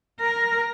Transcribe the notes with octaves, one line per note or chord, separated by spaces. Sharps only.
A#4